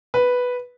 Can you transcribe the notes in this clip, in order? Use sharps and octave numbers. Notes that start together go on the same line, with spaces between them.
B4